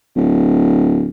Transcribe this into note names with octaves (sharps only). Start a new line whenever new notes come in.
D1